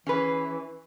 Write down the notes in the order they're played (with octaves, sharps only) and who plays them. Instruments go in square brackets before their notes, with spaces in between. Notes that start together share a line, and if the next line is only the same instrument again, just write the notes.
[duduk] E3 [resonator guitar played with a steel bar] C#4 G#4 B4